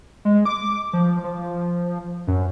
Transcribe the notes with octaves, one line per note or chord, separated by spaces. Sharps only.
G#3
D6
F3
F3
F#2